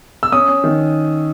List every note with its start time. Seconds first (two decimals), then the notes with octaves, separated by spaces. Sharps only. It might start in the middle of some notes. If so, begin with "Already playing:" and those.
0.23 E6
0.32 C#4 D#6
0.48 C#4
0.64 D#3